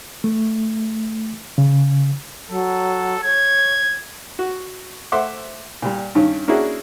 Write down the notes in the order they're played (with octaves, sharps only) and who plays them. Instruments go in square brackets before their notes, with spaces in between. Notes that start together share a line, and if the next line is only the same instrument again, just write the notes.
[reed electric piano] A3
C#3
[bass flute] F#3 [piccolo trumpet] A4
[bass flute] C#5 [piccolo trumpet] G#6
[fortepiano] F#4
A3 C5 E5 F#5 C6 D6
A#2 G3
G2 D#3 C#4
A#3 C#4 D4 E4 F#4 G#4